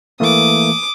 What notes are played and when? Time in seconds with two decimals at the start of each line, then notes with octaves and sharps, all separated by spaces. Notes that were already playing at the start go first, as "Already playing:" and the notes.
0.20 E3 A3 A#3 D6 D#6